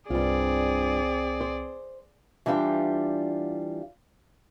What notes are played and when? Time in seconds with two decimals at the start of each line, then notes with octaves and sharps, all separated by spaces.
0.10 C2 G2 C4 F4 G#4 D5
1.41 C5
2.46 E3 G3 D4 F4 G4